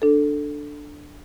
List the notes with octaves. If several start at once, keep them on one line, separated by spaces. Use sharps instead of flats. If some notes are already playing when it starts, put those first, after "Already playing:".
D4 A4